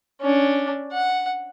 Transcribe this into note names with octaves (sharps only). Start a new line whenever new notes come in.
C#4 D4
F#5